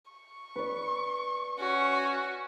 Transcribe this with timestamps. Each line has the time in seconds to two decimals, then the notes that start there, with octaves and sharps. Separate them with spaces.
0.11 C#6
0.56 B4 D5
1.60 C#4 F#4